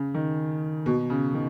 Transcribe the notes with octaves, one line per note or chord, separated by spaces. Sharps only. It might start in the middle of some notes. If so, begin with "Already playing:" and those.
Already playing: C#3
D#3
B2
C#3
D#3